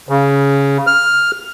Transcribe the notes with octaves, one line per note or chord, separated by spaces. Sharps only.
C#3
F6